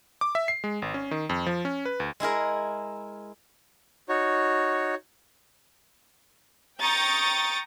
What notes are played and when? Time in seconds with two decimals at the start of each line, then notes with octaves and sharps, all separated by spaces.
0.21 D6
0.35 E5
0.48 C7
0.64 G#3
0.82 G#1
0.94 C#4
1.11 D#3
1.29 F2
1.46 F3
1.65 C#4
1.85 B4
2.00 D2
2.20 G#3 E4 G#4 A#4
4.09 D#4 F#4 C#5
6.81 G5 A#5 C#6 D#6 G6 A6